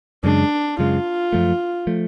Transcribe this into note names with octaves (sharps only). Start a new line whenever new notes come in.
F#2 C#3 G#3 D4
F#2 C#3 G#3 F4
F#2 F3 A3
F3 A3